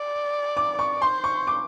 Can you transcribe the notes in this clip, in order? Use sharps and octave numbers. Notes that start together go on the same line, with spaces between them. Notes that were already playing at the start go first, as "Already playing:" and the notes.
Already playing: D5
D6
C#6
C5 C6
C#6
D6